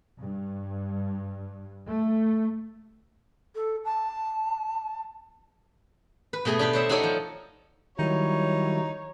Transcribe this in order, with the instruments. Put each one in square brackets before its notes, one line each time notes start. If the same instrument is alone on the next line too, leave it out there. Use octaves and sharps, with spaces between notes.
[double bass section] G2
A3
[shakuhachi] A4
A5
[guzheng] B4
B2 A3 G#4 G#5
D4 G4 B4 B5
C5 C#5 E5
D#4 F#4 A4 C#5 D5
F3
[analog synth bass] D#3 [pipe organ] F#3 G3 E4 [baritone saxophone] D#4 [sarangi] C#5